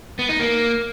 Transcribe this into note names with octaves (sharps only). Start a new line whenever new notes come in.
B3
D#4
A#3